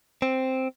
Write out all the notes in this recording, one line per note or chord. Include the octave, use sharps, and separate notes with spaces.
C4